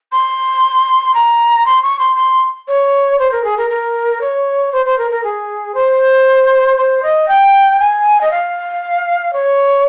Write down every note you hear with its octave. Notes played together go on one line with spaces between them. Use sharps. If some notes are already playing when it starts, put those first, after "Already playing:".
C6
A#5
C6
C#6
C6
C6
C#5
C5
A#4
G#4
A#4
A#4
C#5
C5
C5
A#4
A#4
G#4
C5
C5
D#5
G5
G#5
D#5
F5
C#5